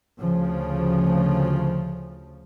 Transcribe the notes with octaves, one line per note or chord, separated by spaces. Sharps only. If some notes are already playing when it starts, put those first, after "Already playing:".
D2 C#3 F3